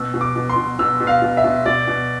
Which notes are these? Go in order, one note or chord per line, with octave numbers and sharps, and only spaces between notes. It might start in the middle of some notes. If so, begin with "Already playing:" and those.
Already playing: B2 E6
B2
D6
B2
C6
B2
B2 E6
B2
F5
B2
E5
B2
B2 D5
B2